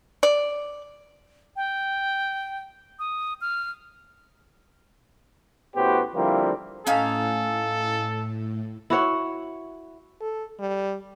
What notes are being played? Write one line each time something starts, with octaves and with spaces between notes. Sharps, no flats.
D5
G5
D#6
F6
A1 A2 B3 F#4 G4 C5
D3 F3 G3 A#3 C4 E4
A2 C#4 D#4 A4 F5
E4 F#4 C#5
A4
G3